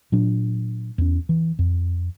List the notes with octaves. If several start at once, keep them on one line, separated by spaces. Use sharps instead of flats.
A#2 F#3 D4
E2 C#4
E3
F2